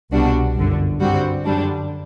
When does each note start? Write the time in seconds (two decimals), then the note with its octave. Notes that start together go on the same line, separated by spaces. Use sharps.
0.11 C2 B2 G3 D4 F#4
0.56 G1 F#2 D3
1.00 G2 D3 G3 C4 F#4
1.45 F#2 D3 G3 D4